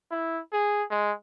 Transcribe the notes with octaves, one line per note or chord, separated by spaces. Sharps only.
E4
G#4
G#3